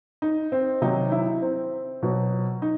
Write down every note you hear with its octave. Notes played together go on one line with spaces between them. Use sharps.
D#4
C4
C3 D#3 F#3 D#4
E4
C4
B2 F#3
D#4